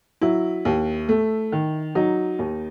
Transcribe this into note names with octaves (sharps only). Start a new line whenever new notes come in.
F#3 E4
D#2
A3
D#3
F#3 D#4
D#2